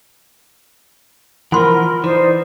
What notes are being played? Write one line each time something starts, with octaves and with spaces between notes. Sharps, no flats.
E3 F3 A#4 F#5 B5 C6
E3 D#4 C5 D5